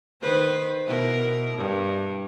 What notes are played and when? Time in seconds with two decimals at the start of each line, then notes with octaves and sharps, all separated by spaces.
0.22 D#3 B4 C5
0.87 B2 E4 A#4
1.57 G2